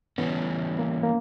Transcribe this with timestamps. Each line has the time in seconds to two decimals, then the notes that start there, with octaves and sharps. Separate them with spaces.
0.18 E3 G3 B3 C#4
0.79 A#3
1.03 A#3